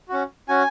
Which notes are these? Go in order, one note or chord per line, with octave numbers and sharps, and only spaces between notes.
C#4 F#4
C#4 F#4 G#5